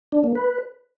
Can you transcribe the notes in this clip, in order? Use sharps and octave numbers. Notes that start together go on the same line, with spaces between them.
D4
A#3
B4